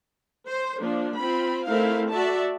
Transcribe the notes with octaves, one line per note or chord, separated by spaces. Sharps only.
C5
F3 A#3 D4
C4 F4 B5
A3 C4 D#4 E4 A#4 F5
F#4 A4 D5 E5 A5